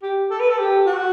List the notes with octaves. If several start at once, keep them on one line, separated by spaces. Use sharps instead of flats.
G4
A4
B4
A4
G4
F#4